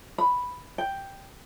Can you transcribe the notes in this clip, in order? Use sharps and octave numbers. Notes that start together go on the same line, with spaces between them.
B5
G5